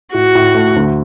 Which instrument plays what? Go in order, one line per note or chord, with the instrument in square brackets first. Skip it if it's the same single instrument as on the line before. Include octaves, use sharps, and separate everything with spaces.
[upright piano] A2 [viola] F#4
[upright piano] A2
A3
D2